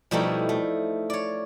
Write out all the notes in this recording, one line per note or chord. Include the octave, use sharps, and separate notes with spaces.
B2 F3 G3 A3 D#4 E4
A3
C#5 D5